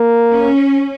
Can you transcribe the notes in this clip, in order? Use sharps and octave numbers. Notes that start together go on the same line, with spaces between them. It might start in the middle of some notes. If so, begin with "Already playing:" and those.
Already playing: A#3
C#4